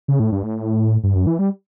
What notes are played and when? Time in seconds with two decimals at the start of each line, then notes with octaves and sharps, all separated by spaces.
0.08 C#3
0.20 A2
0.32 G2
0.44 A2
1.04 G2
1.15 F#2
1.27 E3
1.39 G3